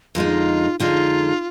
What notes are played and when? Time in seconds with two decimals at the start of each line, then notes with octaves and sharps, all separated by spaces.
0.15 F2 D3 G#3 D#4 F4
0.80 F2 D3 G#3 D#4 F4